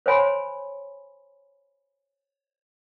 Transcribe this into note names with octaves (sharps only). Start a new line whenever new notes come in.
C5 C#5 G#5 B5 C6